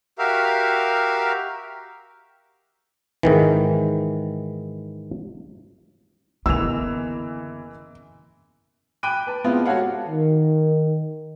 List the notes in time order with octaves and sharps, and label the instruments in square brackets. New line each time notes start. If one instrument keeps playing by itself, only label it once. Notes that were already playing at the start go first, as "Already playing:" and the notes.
[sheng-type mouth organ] F#4 G4 A#4 E5 F5
[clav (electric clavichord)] G#2 D#3 E3
[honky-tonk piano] F#1 E3 F7 [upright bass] D3 B3 [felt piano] E6
[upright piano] G5 B5 D6 F#6 D7 D#7
B4 A5
G#3 B3 C4 E4 F4
F#4 G4 A4 C#5 F5 F#5
[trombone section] D#3